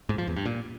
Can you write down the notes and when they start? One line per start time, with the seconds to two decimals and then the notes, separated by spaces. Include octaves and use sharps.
0.09 G#2
0.18 F3
0.27 E2
0.36 G2
0.46 A#2